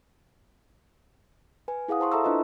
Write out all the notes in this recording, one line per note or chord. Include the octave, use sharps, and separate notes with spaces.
B4 G#5
E4 G#4 F5 F#5 D#6
C5 A5 C6 C#6
A4 E5 A5 A#5 C#6 E6
D4 E4 F4 B4 D#5